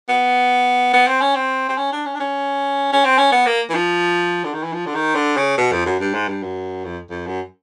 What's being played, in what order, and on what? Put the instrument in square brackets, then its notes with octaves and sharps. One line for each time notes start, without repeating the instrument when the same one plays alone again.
[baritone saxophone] B3
B3
C4
C#4
C4
C4
C#4
D4
C#4
D4
C#4
C#4
C4
C#4
B3
A#3
E3
F3
D3
D#3
E3
F3
D3
D#3
D3
C#3
B2
F2
F#2
G2
G#2
G2
F#2
F2
F2
F#2